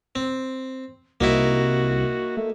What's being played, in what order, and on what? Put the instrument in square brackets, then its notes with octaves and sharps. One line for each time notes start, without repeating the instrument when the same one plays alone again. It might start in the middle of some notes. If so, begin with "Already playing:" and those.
[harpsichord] C4
[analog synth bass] C2 [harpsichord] A#3 D#4 E4 [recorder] F#4
[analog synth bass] A3